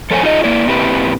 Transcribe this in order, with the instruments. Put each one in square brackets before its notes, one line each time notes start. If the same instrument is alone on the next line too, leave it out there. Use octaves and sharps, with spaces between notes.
[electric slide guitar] F3 A4 C5 C#5 F#5 G#5
D#4 F4 G#4 D#5
A#3 E4 D5
A#2 C4 E4 G4 B4